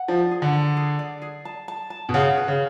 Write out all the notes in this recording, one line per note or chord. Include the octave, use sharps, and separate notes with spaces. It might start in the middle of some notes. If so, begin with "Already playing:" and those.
Already playing: F#5
F3 D5
G#4
D3
A5
G#4
D5
G#4
A5
A5
A5
B2
C#3 F#5
B4
C#3